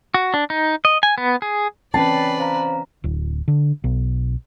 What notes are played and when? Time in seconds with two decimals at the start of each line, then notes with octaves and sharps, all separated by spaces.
0.14 F#4
0.34 D4
0.50 D#4
0.85 D#5
1.03 G#5
1.18 B3
1.42 G#4
1.94 E3 C4 C#4 B4 D5 G5 A5 C7
2.38 C5 F5 A#5
3.04 D1
3.48 D3
3.84 B1